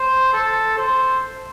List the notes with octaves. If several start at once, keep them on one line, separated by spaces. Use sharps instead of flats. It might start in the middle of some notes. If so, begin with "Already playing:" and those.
Already playing: C5
A4
C5